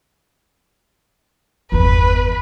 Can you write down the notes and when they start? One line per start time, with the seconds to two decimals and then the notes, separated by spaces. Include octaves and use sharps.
1.72 G1 E2 B4